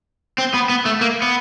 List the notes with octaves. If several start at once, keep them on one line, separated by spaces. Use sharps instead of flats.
C4
B3
B3
A3
A#3
B3